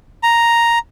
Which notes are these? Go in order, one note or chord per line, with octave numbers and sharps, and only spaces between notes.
A#5